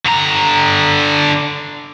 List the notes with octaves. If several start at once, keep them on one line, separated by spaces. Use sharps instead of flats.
D3 A#5